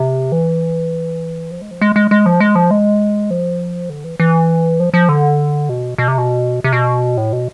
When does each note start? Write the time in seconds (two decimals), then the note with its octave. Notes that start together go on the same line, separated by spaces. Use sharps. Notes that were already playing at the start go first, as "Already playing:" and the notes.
Already playing: C3
0.32 E3
1.51 F3
1.62 G#3
1.71 F3
1.81 G#3
1.96 G#3
2.11 G#3
2.26 F3
2.40 G#3
2.55 F3
2.71 G#3
3.30 F3
3.90 D3
4.04 E3
4.20 E3
4.80 F3
4.94 F3
5.09 D3
5.69 B2
5.98 B2
6.08 C3
6.18 B2
6.64 C3
6.73 B2
7.17 A2
7.33 B2